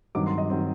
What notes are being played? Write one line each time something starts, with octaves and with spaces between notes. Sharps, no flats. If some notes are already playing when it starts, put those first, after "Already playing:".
G2 D#3 F#3 C4 D6
C6
D#5
D#3 F#3 C4